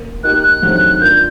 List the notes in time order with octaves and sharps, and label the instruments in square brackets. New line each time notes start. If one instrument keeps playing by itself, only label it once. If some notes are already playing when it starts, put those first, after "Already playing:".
Already playing: [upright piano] A#3
[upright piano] A#3 D#4 G4 [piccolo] F#6
[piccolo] F#6
[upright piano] G2 D#3 F#3 A3 C4
[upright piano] A#3 D4 F4 A#4 [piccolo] G6